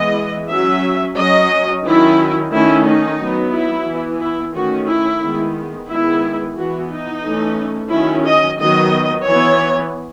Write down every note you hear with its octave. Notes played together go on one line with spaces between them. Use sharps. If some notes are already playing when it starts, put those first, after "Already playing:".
Already playing: E3 G#3 B3 D#5
F#3 C#4 E5
F#3 C#4 D#5
D#3 F#3 C#4 E4
D#3 A3 C#4 E4
D#4
F#3 B3
E4
E3 B3
E4
D#3 A3 C#4 F#4
E4
D#3 G#3 B3
D#3 G#3 B3 E4
E3 B3 F#4
D#4
E3 A3 C#4
D#3 F#3 C#4 E4
D#5
D#3 F#3 B3 D#5
E3 B3 C#5